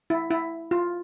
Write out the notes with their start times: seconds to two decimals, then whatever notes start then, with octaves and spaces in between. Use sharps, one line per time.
0.10 E4
0.31 E4
0.71 F4